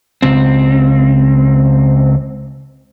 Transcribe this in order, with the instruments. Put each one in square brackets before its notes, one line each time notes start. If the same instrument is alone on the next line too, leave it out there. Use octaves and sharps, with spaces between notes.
[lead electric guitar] C#2 C4